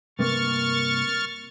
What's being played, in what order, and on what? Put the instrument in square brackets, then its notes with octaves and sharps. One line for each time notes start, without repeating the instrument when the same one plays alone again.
[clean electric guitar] G2 C3 A#3 [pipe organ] C#6 F6 A6